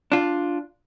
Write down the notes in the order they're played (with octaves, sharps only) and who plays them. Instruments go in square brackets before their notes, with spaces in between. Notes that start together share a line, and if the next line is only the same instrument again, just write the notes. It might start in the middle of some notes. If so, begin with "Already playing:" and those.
[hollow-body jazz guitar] D4 F4